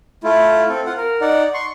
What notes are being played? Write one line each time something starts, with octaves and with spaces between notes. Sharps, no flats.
A3 E4 F4
C4 A4
F4 F#5
A#4
D#4 D5 F#5
C6 C#6